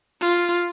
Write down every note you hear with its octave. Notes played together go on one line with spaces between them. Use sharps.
F4